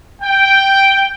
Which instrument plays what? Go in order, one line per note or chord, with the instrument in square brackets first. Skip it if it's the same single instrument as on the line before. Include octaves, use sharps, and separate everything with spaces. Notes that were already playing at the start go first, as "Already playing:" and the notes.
[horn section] G5